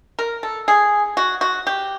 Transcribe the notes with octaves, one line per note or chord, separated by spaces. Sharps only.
A#4
A4
G#4
F#4
F#4
G4